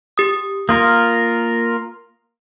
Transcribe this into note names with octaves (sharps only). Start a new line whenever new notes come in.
G4 D#6
A#3 F4 A#4 D#6